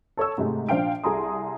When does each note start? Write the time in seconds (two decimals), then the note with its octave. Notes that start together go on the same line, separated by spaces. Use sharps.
0.17 A4 C#5 A5 E6
0.38 G#2 C3 G#3 A3
0.69 A#1 D4 C5 F5 G5 D7
1.04 C2 G#4 A4 A#5 C6 D#6